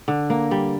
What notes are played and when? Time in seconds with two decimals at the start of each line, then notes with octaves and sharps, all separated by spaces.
0.08 D3
0.30 A#3
0.51 G3